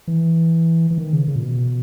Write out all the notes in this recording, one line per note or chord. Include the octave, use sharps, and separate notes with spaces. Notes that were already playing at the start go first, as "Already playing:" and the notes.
E3
E3
D#3
C#3
C#3
A#2
B2